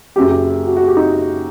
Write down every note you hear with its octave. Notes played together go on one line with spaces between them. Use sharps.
F#1 F#2 F#3 G4
G4
F#4
F#4
G4
D#4